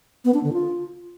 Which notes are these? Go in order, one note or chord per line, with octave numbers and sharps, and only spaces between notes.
B3
D4
D3
F4